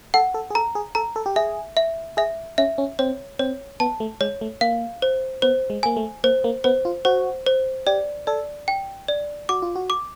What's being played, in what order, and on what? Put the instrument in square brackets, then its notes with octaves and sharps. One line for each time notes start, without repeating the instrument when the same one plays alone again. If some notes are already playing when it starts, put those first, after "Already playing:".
[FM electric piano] A4 [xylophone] F#5
[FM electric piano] A4
G#4
[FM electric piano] A4 [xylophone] A#5
[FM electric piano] G#4
[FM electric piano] A4 [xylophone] A#5
[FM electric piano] A4
G4
[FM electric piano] G#4 [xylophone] E5
[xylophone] E5
[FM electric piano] G#4 [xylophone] E5
[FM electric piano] C#4 [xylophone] E5
[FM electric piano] C#4
[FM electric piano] C4 [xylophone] C#5
[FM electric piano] C4 [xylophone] C#5
[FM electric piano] B3 [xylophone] A5
[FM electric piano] A3
[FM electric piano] G#3 [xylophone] C#5
[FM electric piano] A3
[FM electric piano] A#3 [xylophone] F5
[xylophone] C5
[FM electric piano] B3 [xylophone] C5
[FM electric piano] G#3
[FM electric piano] A#3 [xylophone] G#5
[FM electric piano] A3
[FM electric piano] A#3 [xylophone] C5
[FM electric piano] A#3
[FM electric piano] B3 [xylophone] C5
[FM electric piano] F4
[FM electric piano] F#4 [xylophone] C5
[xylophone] C5
[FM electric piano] G4 [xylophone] D5
[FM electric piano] A4 [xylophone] D5
[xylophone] G5
D5
[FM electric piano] F#4 [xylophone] D6
[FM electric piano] F4
F#4
[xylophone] D6